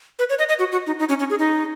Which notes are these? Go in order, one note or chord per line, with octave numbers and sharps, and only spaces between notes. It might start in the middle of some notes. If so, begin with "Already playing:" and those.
B4
C#5
D#5
D#5
F#4
F#4
D#4
D#4
C#4
C#4
G#4
D#4